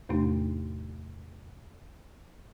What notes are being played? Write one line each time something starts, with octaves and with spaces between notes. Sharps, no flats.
E2 A2 C3 A3 D4 D#4